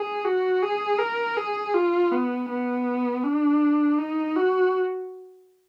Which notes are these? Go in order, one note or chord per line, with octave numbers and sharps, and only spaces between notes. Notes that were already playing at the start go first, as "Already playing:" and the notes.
Already playing: G#4
F#4
G#4
A#4
G#4
F4
B3
B3
D4
D#4
F#4